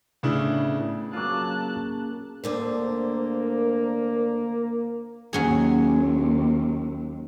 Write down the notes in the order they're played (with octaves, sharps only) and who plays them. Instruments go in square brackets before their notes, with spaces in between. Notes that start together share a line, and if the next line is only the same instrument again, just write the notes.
[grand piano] A2 C#3 B3 D4 E4
[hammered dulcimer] C#3 A#3 D6 [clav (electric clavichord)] F#3 F4 [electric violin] A5 F#6
[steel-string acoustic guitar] D2 D3 C5 [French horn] A#3
[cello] D#2 [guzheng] F#3 C#4 G#4